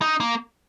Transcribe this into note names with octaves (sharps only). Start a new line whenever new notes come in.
D#4
A#3